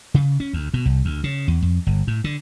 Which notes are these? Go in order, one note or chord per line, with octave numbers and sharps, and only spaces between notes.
C#3
C#4
D2
B2
C2
D2
C#3
E2
F2
G1
A2
D3